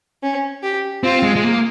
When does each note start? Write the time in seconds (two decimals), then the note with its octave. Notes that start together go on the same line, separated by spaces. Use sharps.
0.23 C#4
0.62 G4
1.03 C4 F4
1.23 G#3
1.36 G#3
1.44 A#3